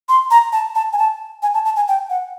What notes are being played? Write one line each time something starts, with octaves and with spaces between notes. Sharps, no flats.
C6
A#5
A5
A5
G#5
A5
G#5
A5
A5
G#5
G5
F#5